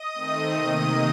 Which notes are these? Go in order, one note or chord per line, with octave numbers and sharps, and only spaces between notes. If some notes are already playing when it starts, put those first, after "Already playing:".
Already playing: D#5 D#6
D#3 A3 C4
C3 D#3 A#3